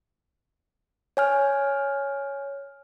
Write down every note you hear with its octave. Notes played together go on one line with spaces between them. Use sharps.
C#5 G#5 F6